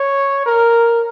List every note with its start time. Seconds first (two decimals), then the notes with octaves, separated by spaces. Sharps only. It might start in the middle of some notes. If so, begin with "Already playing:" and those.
Already playing: C#5
0.46 A#4